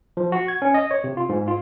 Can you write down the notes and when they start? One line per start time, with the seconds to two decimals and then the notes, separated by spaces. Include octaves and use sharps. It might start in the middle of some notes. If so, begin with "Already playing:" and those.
0.17 F3
0.32 F#4
0.48 G#6
0.62 C#4
0.74 D#5
0.91 C#5
1.04 C3
1.17 F4
1.29 G#2
1.48 F4